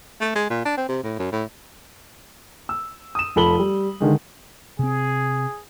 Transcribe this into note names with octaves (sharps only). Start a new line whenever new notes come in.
A3
G#3
A#2
D4
C4
C3
A2
F#2
A2
E6
D#6 E7
F1 F4 A4 B5 F#7 G7
G3
D3 D#3 G#3
C3 C4 G#4